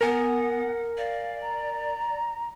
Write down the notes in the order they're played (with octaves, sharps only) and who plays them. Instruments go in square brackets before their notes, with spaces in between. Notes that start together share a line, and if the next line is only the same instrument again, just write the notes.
[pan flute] B3 [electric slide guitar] A#4 G#5 [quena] F#5
[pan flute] D5 [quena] F5
[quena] A#5